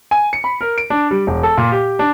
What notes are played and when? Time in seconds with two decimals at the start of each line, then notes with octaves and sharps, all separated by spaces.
0.11 G#5
0.33 C#7
0.44 B5
0.61 A#4
0.78 D7
0.90 D4
1.11 G3
1.27 E1
1.43 A4
1.57 A#2
1.72 G4
1.99 D4